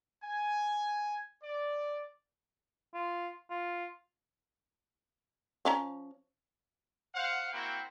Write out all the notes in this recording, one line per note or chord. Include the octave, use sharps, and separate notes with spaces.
G#5
D5
F4
F4
F3 C#4 A#5
C5 F5 F#5
A#3 C4 E4 F#4 F#5 G5